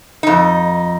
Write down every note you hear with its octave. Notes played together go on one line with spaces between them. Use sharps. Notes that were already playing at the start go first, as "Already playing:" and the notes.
F2 D#4